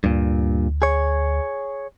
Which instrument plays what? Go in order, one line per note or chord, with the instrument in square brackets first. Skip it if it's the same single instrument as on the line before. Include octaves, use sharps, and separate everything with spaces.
[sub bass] D2 [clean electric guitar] G2 A#2
[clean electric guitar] G#4 C#5